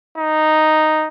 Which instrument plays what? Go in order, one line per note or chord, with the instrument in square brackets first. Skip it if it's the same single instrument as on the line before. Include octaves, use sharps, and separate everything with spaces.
[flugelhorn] D#4